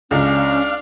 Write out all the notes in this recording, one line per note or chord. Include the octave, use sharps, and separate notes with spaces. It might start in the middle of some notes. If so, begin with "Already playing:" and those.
C#2 C#4 D4 F5